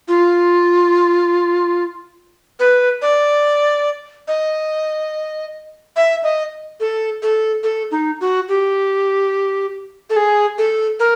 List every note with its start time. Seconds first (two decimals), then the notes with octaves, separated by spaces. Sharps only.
0.08 F4
2.60 B4
3.02 D5
4.28 D#5
5.96 E5
6.24 D#5
6.80 A4
7.23 A4
7.63 A4
7.91 D#4
8.21 F#4
8.49 G4
10.10 A4
10.16 G#4
10.58 A4
11.00 A#4